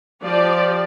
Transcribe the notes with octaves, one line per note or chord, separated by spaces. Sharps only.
F3 G4 D5